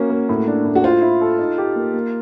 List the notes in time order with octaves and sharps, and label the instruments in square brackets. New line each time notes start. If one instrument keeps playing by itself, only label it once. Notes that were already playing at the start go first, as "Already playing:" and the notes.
Already playing: [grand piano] A#3 C#4 [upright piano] F#4
[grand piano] A#3
A2
D4
A2
[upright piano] F#4
[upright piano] F4 [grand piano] C5
[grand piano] E4
A4
D#4
G4
A#3
A#3